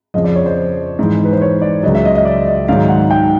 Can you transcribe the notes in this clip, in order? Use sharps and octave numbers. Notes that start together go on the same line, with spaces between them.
F2 C#3 F3 D#5
D5
C#5
C5
G#2 E3
B4
C5
C#5
D5
C#2 C#3 F#3 D#5
E5
D#5
D#5
D5
D#5
G#2 D#3 F#3 F5
F#5
G5